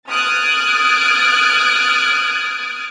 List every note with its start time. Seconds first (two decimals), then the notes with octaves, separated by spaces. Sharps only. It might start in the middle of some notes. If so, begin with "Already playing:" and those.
0.10 D#6 F6 F#6 G#6 A6 D7